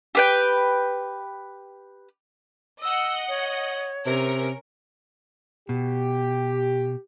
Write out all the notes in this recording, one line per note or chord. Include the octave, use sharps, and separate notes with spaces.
G4 B4 G5
D#5 F#5 E6
C#5
C3 C#4 A#4
B2 G4